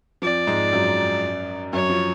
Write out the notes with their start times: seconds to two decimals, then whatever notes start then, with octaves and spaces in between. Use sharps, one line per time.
0.22 F2 F3 D5
0.47 G#2 G#3
0.73 F#2 F#3
1.73 F#2 F#3 C#5
1.89 F3